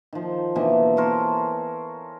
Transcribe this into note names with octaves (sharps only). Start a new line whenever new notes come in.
D#3 F3
B2 D3 E3 A#3
A4 A#4 C5 C#5